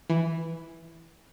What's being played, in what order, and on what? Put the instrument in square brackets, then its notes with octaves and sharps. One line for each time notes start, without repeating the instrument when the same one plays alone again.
[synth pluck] E3